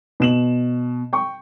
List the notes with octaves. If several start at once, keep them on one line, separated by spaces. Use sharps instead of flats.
B2 E7 F#7
G5 C#6